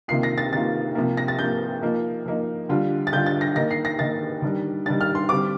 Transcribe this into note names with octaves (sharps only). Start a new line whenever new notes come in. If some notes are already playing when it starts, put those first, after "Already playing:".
C3 D#3 A#3 F4 C7
A#6
A6
C3 D#3 A#3 F4 A6
C3 F3 A#3
A#6
A6
C3 F3 A#3 G6
F3 A#3 D#4
F3 A#3 D#4
D3 G3 D4 F4
A6
D3 G3 D4 F4 G6
A6
A#6
D#3 A#3 D#4 A#6
C7
A#6
D#3 A#3 D#4 A6
D#3 G3 D4
D#3 G3 D4 A6
F6
C6
D3 G3 C4 D6